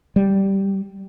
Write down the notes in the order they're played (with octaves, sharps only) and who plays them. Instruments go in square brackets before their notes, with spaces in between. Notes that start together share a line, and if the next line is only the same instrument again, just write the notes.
[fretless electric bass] G3